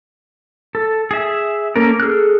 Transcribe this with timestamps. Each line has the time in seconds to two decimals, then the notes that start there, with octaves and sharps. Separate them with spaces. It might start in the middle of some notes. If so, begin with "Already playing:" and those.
0.75 A4
1.11 G#4 E5
1.76 A#3 C#4 A4 A#4
2.00 G#4 A4 F6 F#6